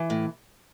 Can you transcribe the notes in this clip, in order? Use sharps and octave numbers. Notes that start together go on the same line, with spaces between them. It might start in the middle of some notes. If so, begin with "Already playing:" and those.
Already playing: E3
A2